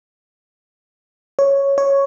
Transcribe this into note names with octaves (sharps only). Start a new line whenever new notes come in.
C#5
C#5